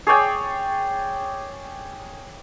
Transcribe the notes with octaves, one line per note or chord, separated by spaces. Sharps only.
G#4 C#5 D5 G5